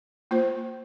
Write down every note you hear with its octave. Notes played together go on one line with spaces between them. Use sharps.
A#3 F4 C5